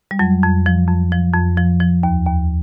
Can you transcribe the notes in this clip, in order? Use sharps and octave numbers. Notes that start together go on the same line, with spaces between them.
G3
F2 F#3
F2
F3
F2
F3
F2
F3
F3
D#2
D#2